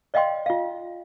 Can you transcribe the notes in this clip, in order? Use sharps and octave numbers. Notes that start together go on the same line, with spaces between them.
D5 D#5 F5 G5 C6
F4 F5